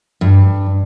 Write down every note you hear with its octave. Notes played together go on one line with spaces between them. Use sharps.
G2